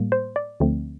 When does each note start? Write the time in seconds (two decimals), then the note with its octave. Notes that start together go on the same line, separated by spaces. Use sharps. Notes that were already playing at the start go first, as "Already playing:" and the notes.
Already playing: A2 G3 A#3
0.12 C5
0.36 D5
0.60 D2 D3 F3 A3 C4